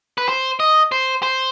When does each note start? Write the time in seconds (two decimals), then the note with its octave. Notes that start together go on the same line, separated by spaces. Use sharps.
0.18 B4
0.29 C5
0.60 D#5
0.92 C5
1.23 C5